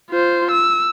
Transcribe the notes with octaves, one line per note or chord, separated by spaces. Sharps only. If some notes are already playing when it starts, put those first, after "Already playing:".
F4 C5
E6